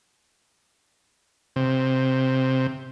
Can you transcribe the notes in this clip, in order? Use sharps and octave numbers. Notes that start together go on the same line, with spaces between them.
C3